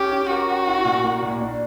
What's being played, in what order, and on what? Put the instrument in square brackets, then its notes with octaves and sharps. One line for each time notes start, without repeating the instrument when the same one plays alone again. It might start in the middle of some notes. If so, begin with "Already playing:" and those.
Already playing: [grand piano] C#4 [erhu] G4
[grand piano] C#4
[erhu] F#4 [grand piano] A#4
[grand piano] G4
E4
A#2
A#3
A#2
D4